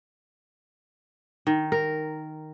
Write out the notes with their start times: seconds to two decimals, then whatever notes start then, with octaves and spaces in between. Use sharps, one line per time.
1.47 D#3
1.72 A#4